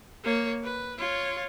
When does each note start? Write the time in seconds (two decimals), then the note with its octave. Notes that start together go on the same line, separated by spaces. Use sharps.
0.24 A#3 C#5
0.64 B4
0.98 F4 C#5